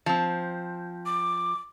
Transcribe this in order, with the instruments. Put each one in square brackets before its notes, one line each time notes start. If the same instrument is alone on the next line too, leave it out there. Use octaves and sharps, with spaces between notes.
[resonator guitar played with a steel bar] F3 C4
[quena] D6